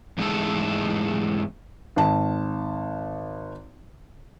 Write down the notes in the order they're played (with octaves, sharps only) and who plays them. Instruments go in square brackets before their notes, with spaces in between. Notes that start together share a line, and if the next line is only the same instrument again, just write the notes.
[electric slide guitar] E2 G#2 G#3 A3 A4
[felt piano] G#1 A5